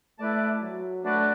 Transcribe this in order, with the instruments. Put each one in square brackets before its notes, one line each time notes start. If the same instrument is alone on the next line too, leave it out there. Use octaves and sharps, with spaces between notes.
[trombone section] A3 [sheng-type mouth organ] E4 B4 D5 A5
[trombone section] F#3
[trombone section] A3 [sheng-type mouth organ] D4 F#4 B4 D5 A5